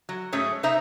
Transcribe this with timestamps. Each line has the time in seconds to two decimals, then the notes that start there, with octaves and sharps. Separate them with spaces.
0.09 F#3
0.32 G#2 F#3 A3 C#4 G#4 C#5
0.63 C3 D#4 C5 E5 A#5